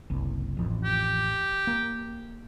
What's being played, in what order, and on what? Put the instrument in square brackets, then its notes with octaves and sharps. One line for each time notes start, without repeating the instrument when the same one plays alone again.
[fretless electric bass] F#1 C2
A1 F2
[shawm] G4
[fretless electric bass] A#3